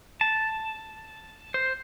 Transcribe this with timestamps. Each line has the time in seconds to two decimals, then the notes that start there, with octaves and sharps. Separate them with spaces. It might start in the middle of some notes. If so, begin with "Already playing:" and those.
0.21 A5
1.54 C5